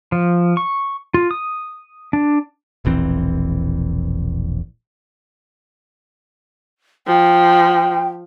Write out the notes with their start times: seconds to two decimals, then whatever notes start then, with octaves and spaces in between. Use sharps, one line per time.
0.12 F3
0.57 C#6
1.14 F4
1.31 D#6
2.13 D4
2.85 E1 A#1 E3 C4
7.07 F3 G5